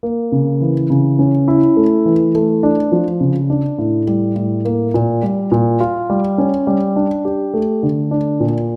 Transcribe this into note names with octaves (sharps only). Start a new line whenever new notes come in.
A#3
C#3
E3
C#3
C#4
E4
A3
E3
A3
D4
F3
C#3
D4
A2
G3
A2
A#3
A#2
G3
A#2
F4
G3
C#4
G3
D4
G4
A3
D3
D4
A#2